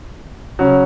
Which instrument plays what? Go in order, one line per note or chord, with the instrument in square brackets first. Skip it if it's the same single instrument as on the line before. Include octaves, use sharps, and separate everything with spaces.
[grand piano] C#3 F#3 C#4